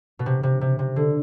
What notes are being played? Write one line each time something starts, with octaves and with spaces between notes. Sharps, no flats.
B2
C3
C3
C3
C3
D3